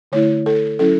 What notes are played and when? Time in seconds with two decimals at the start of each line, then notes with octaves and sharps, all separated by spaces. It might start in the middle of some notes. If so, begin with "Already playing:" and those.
0.12 D3 A3 E4 C#5
0.46 A4
0.79 F#3 C#4 E4 A4